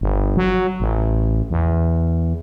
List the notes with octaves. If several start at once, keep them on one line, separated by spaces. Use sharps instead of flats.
G1
F#3
A1
E2